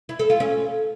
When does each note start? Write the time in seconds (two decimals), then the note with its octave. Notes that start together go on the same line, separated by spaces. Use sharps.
0.09 E4
0.19 A4
0.30 F4
0.40 C#4